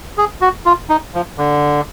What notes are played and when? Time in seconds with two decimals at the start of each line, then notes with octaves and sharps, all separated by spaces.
0.18 G#4
0.41 F#4
0.66 F4
0.89 D#4
1.14 F3
1.38 D3